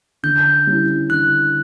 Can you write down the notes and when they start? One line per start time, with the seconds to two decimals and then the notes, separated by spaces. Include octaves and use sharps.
0.23 D3 G6
0.67 G3 C#4 E4
1.10 D3 F#6